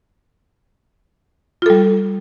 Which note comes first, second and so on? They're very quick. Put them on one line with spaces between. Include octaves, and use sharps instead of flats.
F4 A4 G3